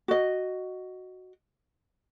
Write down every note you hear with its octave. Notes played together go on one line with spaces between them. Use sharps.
F#4 D#5